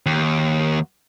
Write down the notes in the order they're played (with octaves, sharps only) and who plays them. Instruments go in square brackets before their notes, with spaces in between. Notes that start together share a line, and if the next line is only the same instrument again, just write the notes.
[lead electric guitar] D#2